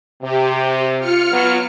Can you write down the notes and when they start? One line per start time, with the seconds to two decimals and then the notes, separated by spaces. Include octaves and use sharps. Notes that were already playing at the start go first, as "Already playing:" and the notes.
0.23 C3 G4
0.99 F4 F6 C#7
1.32 F#3 B3